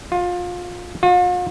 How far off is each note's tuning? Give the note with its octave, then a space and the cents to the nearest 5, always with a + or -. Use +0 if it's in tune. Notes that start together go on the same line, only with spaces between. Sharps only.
F4 +25
F4 +45